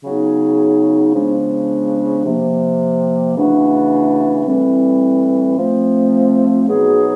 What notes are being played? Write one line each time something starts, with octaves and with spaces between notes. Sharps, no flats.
C#3 F#3 B3 D#4 G#4
C#3 F3 G#3 B3 D4
C3 F3 A#3
C#3 E3 A3 D4 F#4
A2 E3 G3 C4
F3 A3 C4
B2 F#3 B3 D#4 G#4